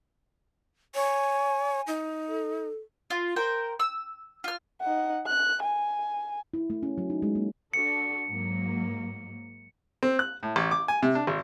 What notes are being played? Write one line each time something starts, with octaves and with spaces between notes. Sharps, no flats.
C#5 G#5
D#4
A4
F4
A#4 C5 G5
E6
F4 F6
D#4 F#5
F#6
G#5
E4
A3
C#4
F#3
D#4
G#3
A#3
D4 F#4 A4 C#7
G#2 F#3 A#3
C4
F#6
A2
A1
D6
G#5
C3
D4
G#1